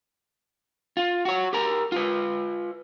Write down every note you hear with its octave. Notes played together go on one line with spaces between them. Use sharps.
F4
F#4 C#5
G4 A#4 A#5
F4 B4